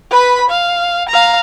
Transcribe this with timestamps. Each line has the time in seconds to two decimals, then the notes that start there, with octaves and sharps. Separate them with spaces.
0.10 B4 B5
0.49 F5
1.09 F5 A#5